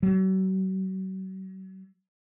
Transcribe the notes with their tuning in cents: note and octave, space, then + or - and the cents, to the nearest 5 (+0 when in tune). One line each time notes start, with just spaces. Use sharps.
F#3 +40